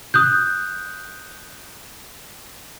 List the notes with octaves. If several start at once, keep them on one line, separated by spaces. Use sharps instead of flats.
D#6 F#6 G6